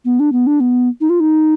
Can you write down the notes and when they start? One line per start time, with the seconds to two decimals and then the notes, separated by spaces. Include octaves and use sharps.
0.05 B3
0.19 D4
0.32 B3
0.47 D4
0.60 B3
1.01 D#4
1.09 F4
1.20 D#4